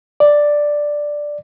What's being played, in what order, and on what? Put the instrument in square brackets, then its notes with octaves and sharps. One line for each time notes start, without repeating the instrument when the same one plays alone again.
[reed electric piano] D5